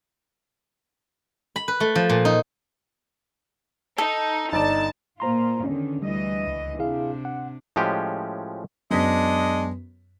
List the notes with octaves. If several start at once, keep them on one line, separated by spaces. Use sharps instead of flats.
B5
B4
A3
F3
A#2
D#4
D#4 A4
G1 D#4 D5 A5
A#2 F4 C5 A#5 C6
E2 D3 D#3 C#4
D2 E3 G3 D#5
C#2
C3 D4 E4 G#4 F5
F#5
A2 F3 G#3 C#4 G4
F#2 G#3 B3 D4 D#5 B6